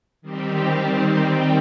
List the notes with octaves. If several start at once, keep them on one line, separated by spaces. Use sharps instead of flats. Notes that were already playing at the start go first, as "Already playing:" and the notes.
D#3 G3 C4 G4